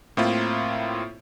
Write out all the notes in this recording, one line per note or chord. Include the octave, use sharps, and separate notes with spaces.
A2 A#3 C4 E4 F4